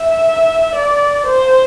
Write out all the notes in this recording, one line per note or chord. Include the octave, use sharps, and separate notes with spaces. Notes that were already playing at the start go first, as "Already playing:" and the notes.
Already playing: E5
D5
C5